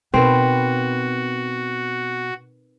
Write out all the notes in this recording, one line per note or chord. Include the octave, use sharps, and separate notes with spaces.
B2 C4 D#4 F#4 A#4 B4